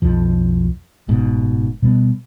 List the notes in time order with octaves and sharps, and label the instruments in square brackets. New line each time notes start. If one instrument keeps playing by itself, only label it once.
[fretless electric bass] B1 F2 F3
F#1 G#2 B2
B2 G3 B3